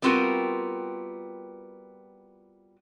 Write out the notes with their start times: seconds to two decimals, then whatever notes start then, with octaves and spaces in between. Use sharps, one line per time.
0.02 G3 B3 C4 F4 F#4 A#4